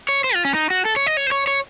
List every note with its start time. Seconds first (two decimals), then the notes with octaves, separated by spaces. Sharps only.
0.09 C#5
0.24 C5
0.34 F4
0.45 C#4
0.54 D#4
0.70 F#4
0.85 A4
0.96 C#5
1.06 D#5
1.17 C#5
1.27 C5
1.32 C#5
1.47 C#5